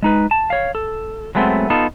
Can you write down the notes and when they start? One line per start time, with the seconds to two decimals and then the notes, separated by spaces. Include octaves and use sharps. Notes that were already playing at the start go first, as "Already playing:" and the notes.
0.02 G#3 D#4 B4
0.31 A5
0.50 C#5 F5
0.75 A4
1.35 F#3 G#3 A3 B3 C4
1.70 B3 D#4 F4 A4